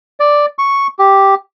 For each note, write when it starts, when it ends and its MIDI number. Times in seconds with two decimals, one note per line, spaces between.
0.20 0.46 74
0.59 0.87 85
0.99 1.35 67